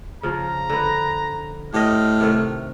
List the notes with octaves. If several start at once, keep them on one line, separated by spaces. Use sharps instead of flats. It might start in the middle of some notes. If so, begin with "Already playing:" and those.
C#3 F3 A#5
D3 B4
A2 G4 D#5 F6
C3 D#3 A3